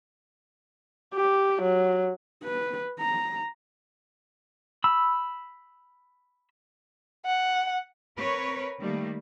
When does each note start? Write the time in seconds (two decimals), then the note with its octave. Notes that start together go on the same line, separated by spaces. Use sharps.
1.14 G4
1.62 F#3
2.43 B4
2.99 A#5
4.84 B5 E6
7.25 F#5
8.18 C4 A#4 B4 C#5
8.81 D#3 G3 A3 A#3